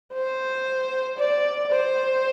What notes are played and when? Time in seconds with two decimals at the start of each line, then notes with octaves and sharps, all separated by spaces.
0.13 C5
1.18 D5
1.71 C5